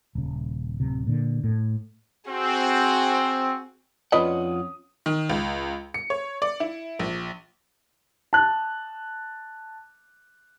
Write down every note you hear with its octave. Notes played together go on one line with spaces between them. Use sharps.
D#1 C#3
D1 C3
A#2 D3
A2
C4 F#4 G#4
F2 C#4 F4 B4 D5 D#5 F#5 D#6
D#3
C#2
C#7
C#5
D5
E4
A#1
A5 F#6